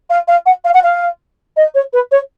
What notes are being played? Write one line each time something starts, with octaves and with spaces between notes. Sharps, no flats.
F5
F5
F#5
F5
F#5
F5
D#5
C#5
B4
C#5